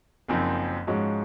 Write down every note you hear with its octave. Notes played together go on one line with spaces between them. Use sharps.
F#1 F#2 F3 C4 D#4
G#2 F3 G#3 C#4 F#4